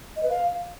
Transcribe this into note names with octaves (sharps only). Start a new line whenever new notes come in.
D#5
B4
F5